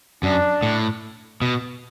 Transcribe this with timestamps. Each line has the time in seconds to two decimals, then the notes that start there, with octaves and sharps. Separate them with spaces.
0.23 F#2 D4
0.63 A2
1.42 B2